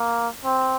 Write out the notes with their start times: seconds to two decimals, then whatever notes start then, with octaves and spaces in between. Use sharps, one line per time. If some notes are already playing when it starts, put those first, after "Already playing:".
Already playing: A#3
0.45 C4